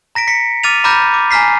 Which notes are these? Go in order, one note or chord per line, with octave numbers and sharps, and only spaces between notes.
A#5 A#6 B6 D7
B6 C#7
D6 F6 A6 D#7 F7
A#5 B5 D6 F6 G6 A#6
D6
G#5 A#5 F6 B6 C7